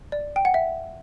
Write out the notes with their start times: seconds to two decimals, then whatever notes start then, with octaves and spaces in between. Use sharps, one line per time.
0.12 D5
0.36 G5
0.45 F#5
0.54 E5